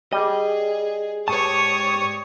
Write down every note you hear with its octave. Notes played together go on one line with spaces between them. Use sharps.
G3 G#4 D#5
G#2 G4 C#5 D5 A5 C#6 D#6